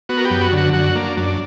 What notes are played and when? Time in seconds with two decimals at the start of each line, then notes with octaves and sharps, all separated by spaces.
0.09 B3 F#4
0.17 A#4
0.25 G4
0.30 F#2
0.41 F#4
0.52 D3
0.58 F#4
0.73 F#2 F#4
0.95 A#3 D4
1.17 F#2 D4